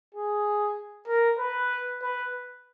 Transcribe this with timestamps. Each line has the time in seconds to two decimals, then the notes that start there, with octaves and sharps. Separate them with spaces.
0.15 G#4
1.08 A#4
1.39 B4
2.02 B4